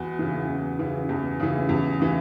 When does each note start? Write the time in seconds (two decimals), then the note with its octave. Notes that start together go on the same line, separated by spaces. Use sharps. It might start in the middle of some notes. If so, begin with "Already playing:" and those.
Already playing: E2 F#4
0.19 C#3 E3
0.49 E2
0.79 C#3 E3
1.09 E2
1.40 C#3 E3
1.69 E2
2.00 C#3 E3